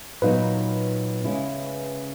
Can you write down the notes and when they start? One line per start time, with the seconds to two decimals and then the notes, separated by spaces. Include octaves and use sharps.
0.22 A#2 F#3 B3 D#4 B4
1.25 C#3 G#3 C#4 E4